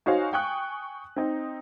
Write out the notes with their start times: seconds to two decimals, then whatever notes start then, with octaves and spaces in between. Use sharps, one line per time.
0.06 D#4 F#4 C5 C#5 F5 G#5
0.33 G5 G#5 C#6 D#6 F#6
1.16 C4 D#4